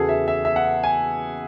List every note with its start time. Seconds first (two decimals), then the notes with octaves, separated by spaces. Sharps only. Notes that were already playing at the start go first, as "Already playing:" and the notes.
Already playing: E2 C#3 E3 F#4 G#4 A4
0.09 E5
0.28 E5
0.45 E5
0.56 F#5
0.83 G#5